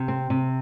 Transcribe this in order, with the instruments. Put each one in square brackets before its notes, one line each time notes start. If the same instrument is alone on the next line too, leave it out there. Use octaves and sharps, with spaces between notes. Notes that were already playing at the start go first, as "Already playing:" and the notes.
Already playing: [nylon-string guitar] C3
C4
C3